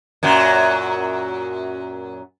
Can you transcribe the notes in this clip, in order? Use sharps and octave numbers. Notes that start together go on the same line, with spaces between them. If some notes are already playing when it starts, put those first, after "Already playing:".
F#2 A#2 F#3